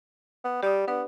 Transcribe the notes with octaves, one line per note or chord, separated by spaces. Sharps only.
B3
G3 G4 D5 D#6
B3 D4 B4 D5